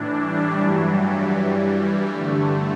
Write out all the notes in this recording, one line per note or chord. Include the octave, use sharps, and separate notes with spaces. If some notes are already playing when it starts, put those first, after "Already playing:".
Already playing: A2 E3 D4
G3
G2 E3 F#3
G3
G2 E3
G2 D3 A3